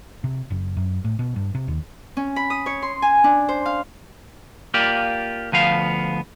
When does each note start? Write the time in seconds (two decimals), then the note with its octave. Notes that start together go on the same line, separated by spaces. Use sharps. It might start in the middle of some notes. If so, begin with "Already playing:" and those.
0.24 C3
0.50 F#1
0.77 F#2
1.04 A2
1.19 B2
1.36 G2
1.55 C3
1.68 D#2
2.17 C#4
2.36 B5
2.50 D#6
2.66 C#5
2.82 C6
3.02 G#5
3.24 D4
3.49 C5
3.65 F5
4.74 A#3 F4 G4 D5
5.52 D2 F3 B3 F5